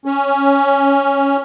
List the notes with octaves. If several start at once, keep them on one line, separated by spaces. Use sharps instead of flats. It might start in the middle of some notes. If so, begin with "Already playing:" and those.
C#4